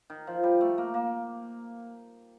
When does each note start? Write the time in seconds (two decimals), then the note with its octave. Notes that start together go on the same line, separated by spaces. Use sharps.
0.10 D#3
0.27 F3
0.43 G3
0.61 A3
0.78 A#3
0.94 A#3